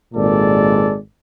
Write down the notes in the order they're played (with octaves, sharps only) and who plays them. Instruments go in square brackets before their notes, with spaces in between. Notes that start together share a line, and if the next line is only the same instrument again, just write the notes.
[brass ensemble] G#1 A#2 G#3 A4 D5